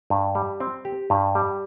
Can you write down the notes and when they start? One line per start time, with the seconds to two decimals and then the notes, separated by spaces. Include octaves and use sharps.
0.10 G2
0.35 G3
0.60 C4
0.85 G4
1.10 G2
1.35 G3